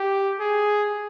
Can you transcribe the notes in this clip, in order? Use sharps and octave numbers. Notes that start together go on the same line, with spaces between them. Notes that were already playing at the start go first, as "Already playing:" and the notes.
Already playing: G4
G#4